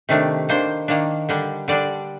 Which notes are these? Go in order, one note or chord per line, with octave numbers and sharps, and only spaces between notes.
C3 D#3 A3 D4
D#3 A#3 D4 C5
D#3 A#3 D4
D3 G3 D4
D3 G3 D4 D5